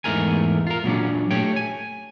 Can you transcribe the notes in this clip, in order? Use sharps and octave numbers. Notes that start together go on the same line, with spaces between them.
E2 G#2 A3 A#4 G#5
F4 A#4
A#2 F#3 C#4 D4
A3 G4 C#5 G5
G#5